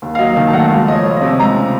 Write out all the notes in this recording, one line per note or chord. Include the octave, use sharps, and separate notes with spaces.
D#2
F5
F#3 D#5
D#3 A5
A5
A3 F#5
C#2 F5
F3 D#5
C#5
A3
D#5
C3
C#2 A#5
C#3